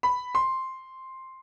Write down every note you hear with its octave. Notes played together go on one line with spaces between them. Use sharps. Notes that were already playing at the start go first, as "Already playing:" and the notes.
B5
C6